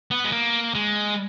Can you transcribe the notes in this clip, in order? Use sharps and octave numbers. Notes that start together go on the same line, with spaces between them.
B3
G#3
A#3
G#3